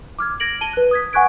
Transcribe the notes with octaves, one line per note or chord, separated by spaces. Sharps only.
D6 F6 G#6
G#6 A#6 D7 F#7
A5 D#7 G7
B4 F#6
D#6 G#6 B6
F#5 G#5 C#6 F#6 G#6 D7